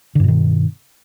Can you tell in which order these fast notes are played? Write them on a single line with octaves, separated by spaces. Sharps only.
D3 G2 B2 D#3